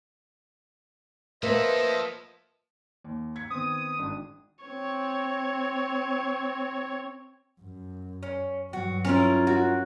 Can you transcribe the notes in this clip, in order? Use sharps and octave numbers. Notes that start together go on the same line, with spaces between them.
F3 A#3 A4 B4 C5 D#5 E5
D#2
G#6 B6 C#7
D#3 B3 C4 D#6
G#1 D4
C4 C#5
F#2
C#4
G2 F#3 F#4
C#4 E4 F4 A#4
F#4